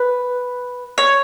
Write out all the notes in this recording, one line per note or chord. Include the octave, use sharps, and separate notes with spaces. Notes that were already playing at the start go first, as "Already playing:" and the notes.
Already playing: B4
C#5